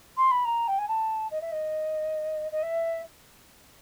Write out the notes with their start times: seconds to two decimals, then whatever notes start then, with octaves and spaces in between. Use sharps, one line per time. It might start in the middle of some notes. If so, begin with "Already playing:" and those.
0.17 C6
0.31 B5
0.45 A#5
0.68 G5
0.78 G#5
0.88 A5
1.31 D#5
1.41 E5
1.52 D#5
2.52 D#5
2.63 E5